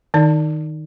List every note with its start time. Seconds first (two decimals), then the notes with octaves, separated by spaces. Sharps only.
0.14 D#3 D#4 D5